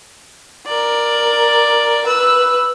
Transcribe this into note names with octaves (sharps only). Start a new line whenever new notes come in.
A#4 D5
B4 E6